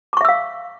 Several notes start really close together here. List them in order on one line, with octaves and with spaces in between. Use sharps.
D6 C#6 E5 E6 F5